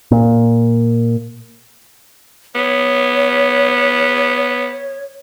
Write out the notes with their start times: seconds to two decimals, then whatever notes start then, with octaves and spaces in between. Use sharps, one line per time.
0.11 A#2
2.55 B3 C#5